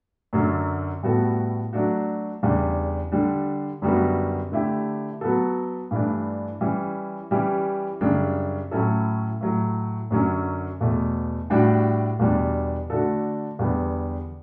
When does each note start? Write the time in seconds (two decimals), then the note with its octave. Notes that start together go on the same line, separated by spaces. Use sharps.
0.33 F#2 D3 F#3
1.03 A2 G3 B3 F#4 A4
1.73 F#3 A3 D4 F#4
2.43 E2 C#3 G3 D4
3.12 D3 G3 D4
3.82 F#2 D3 G3 B3 F#4
4.52 D3 A3 E4 G4
5.21 F#3 B3 F#4 A4
5.91 G2 E3 A3 D4
6.61 E3 G3 C#4
7.31 E3 G3 C#4 G4
8.01 F#2 C#3 G3 D4
8.71 A2 F#3 C#4 E4 A4
9.41 A2 F#3 A3
10.11 F#2 D3 F#3 C#4
10.81 E2 B2 A3
11.50 A2 G3 D4 F#4
12.19 E2 B2 G3 D4
12.90 D3 A3 D4 F#4 A4
13.59 E2 D3 G3 B3